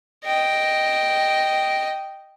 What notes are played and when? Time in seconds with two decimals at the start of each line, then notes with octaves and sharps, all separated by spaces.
0.25 D#5 G5